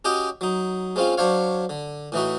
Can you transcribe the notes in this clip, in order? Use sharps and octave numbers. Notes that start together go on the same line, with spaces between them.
C#4 F#4 G4 D#5 G5
F#3 D#4
G#3 C4 C#4 F4
F#3 D4 C5 C#5 F5
D3
A2 E3 D#4 F#4